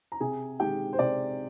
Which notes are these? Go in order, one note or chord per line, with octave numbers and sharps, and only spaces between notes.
A#5
C3 G#4 G#5
D#3 G#3 G4 G5
C5
C3 D5